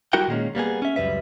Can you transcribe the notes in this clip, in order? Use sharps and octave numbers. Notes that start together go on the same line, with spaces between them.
G3 E4 F#4 A#4 F#5 G5
A#2 D#3 G#3 A#3 C#4
G3 A#3 B3 G#4
C#4 E5
C#2 F#2 C#3 G3 B4 E5